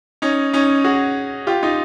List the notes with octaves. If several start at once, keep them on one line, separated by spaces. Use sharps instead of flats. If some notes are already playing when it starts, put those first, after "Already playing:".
C#4 D#4
C#4 D#4
F#4 G#4
F4 G4
D#4 F4